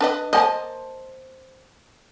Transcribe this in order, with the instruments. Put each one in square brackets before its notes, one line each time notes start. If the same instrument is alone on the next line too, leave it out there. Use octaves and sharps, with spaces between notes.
[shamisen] D4 B4 D#5
[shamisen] A#3 D#5 [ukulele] C5 A5